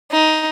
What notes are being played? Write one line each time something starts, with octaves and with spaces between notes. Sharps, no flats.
D#4